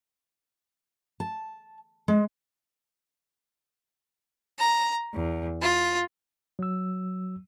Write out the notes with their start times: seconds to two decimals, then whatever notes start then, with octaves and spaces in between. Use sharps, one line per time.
1.20 A5
2.08 G#3
4.59 A#5
5.13 E2
5.62 F4
6.59 F#3 E6